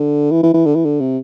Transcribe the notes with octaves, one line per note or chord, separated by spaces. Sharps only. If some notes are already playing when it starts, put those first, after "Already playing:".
Already playing: D3
E3
E3
E3
D3
E3
D3
C3